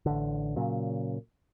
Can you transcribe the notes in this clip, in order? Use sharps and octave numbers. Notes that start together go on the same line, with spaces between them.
A1 D3
A#2 C#3 F#3